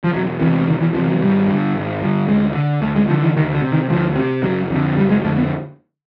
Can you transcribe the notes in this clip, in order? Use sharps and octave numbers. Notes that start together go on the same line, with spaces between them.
F3
E1 F#3
E2 C3 E3
E1 D#3
E3
E2 C3 F3
F#3
G#1 G3
G2 D3
G#1
G2 D3
D2 G#3
D3
D2 A3
G#3
D3 F3
E3
D2 D#3
D3
C3
D#3
D2 F3
C3
F#1 F#3
F2 D3
F#1 G3
G#3
F2 D3 A3
B3